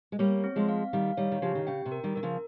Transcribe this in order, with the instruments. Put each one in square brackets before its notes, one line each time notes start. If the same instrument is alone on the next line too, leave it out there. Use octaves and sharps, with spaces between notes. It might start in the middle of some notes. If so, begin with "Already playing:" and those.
[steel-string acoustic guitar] G#3
[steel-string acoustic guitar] G3 A#3 [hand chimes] C#5
[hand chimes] C4
[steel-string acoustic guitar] F3 G#3
[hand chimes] F5
[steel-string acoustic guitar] D#3 G3 [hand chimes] F5
[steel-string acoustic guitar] D#3 G3 [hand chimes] C#5
[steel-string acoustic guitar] D#3
[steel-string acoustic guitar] C#3 F3 [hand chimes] G4
[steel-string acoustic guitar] D#3
[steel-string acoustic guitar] C#3 [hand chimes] G5
[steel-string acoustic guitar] C3
[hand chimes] A#4
[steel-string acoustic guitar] D#3 G3
[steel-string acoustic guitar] D#3 [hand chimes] A#4
[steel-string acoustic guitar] C#3 F3